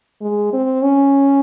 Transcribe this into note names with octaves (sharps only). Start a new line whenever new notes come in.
G#3
C4
C#4